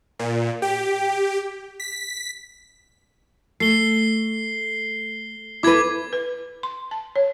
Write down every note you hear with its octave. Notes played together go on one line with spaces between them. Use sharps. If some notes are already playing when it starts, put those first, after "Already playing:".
A#2
G4
B6
A3 C7 G7
E4 A4 B4 D6 G#6
B4
C6
A5
C#5